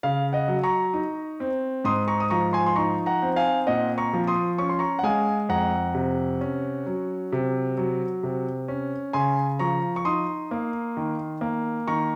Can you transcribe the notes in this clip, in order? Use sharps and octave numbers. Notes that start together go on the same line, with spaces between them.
C#3 F5
D#5 F#5
F#3
A#5 C#6
D#4
C4
G#2 C6 D#6
A#5 C#6
D#6
F3 A#5 C#6
G#5 C6
C6
D#4 A#5 C#6
F#5 A#5
C4
F5 G#5
A#2 D#5 F#5
A#5 C#6
F3
C6 D#6
C#4 C#6
C6
A#5 C#6
F#5
G#3 F5 G#5
F2 F#5 A#5
C3
C#4
F#3
C3
F#3
C3
C#4
C#3 G#5 C6
F3 A#5 C#6
C#6
D#4 C6 D#6
A#3
D#3
A#3
D#3 A#5 C#6